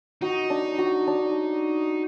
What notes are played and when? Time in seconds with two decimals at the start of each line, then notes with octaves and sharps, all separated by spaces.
0.21 D#4 F#4
0.50 D4
0.79 F#4
1.07 D4